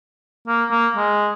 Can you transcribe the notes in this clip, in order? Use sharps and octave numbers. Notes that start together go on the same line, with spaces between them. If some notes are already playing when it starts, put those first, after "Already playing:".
A#3
A#3
G#3